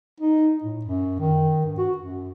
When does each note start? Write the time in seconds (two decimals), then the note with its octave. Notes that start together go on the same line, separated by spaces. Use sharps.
0.20 D#4
0.64 A2
0.85 F#2
1.20 D#3
1.65 G2
1.78 F#4
1.98 F#2